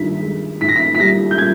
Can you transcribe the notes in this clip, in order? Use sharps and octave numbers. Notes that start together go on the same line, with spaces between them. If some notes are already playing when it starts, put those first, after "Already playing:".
Already playing: G2 D#3 B6
G#3
G#2 B6
A#6
B6
B6
G3 A#6
G6
G#6